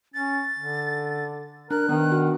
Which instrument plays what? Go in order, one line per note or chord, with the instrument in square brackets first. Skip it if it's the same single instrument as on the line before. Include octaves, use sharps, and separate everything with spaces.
[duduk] C#4 [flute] A6
[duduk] D3
[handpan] D4 [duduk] A#4 [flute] F#6
[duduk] D#3 [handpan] B3 D4
[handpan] F#4